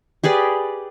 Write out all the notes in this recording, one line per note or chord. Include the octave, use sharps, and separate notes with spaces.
G4 G#4 B4 D5